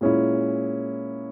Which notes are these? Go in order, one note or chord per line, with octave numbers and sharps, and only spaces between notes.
A#2 G#3 C#4 E4